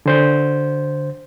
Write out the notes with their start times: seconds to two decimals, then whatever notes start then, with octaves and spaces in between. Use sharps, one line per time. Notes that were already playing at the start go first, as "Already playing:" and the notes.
0.06 D3 C5 G6